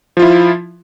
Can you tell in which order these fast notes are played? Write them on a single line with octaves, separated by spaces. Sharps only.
F3 F4 E4